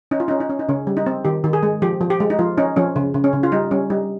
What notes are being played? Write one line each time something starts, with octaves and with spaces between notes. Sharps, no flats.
C#4 D#4
F4
C#4 D#4
D#4
C#4
D#4
C#3 C#4
G3
D#4
C4
D#3 G4
D#3
G#4
G#3
F3 G4
F3
G4
G#3
D#4
F3 F4
C#4 D#4
F3 C#4
C#3
C#3
C#4
C#3
F4
G3 D#4
G3 C#4
G3 D#4